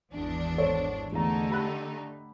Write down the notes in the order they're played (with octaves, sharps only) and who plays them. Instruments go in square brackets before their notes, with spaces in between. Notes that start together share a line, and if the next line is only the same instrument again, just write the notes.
[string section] G#1 E2 D4
[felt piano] A4 C5 C#5
[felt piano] E2 A#5 [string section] D3 A3 D#4
[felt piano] G4 B5 F#6